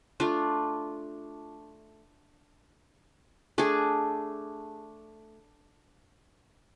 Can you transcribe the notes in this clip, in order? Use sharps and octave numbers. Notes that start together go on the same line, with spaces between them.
A3 D4 F4
A3 D4 G#4